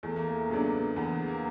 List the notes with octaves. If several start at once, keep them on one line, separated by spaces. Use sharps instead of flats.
E2 A3
A#3
A3
C#3 F#3 A#3 B3 D4
E2 B3
A#3